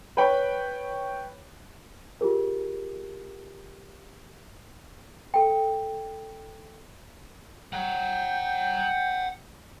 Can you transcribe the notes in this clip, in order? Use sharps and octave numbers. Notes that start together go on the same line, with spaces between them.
B4 C#5 G5 B5
F4 G4 G#4 A#4
A4 G5
F#5 G5 A#5